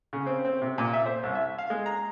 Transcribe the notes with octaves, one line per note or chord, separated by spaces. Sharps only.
C#3
C4
C4
C3
A#2
E5
C5
C2
E5
F5
G#3
A#5